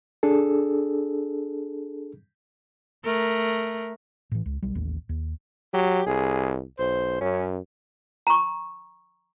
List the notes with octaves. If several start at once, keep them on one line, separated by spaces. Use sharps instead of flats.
D4 G#4 A4
A3 A#4
A2 E3
C#2
B1 G3
A1 D#2 A2
D#2
F#3 G4
C2 G#4
B1 C5
F#2 C#4
A#5 C#6